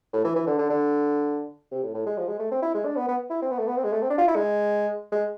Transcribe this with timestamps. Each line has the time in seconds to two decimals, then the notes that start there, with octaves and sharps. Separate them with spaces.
0.13 A2
0.24 E3
0.36 E3
0.47 D3
0.58 D3
0.70 D3
1.72 C3
1.83 A2
1.94 A2
2.06 G#3
2.17 F3
2.28 G#3
2.39 A3
2.51 C4
2.62 E4
2.74 G#3
2.85 D4
2.96 B3
3.08 B3
3.30 E4
3.42 C4
3.51 B3
3.58 A3
3.67 B3
3.76 C4
3.84 G#3
3.93 A3
4.02 C4
4.10 D4
4.18 F4
4.28 E4
4.36 G#3
5.12 G#3